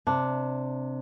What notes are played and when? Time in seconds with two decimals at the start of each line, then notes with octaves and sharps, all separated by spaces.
0.07 C3 D4